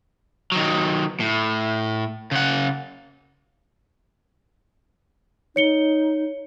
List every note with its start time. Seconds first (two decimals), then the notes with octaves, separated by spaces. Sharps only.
0.52 D#3 F#3
1.20 A2
2.31 C#3 F#5
5.56 D#4 C#5 C#7 G7